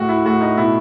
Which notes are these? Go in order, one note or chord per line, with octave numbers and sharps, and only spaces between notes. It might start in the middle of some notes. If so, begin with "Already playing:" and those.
Already playing: A2 F#4
E4
A2 F#4
D#4
B2 E4